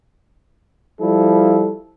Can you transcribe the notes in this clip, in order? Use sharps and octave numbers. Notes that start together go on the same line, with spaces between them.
F3 G3 E4 A4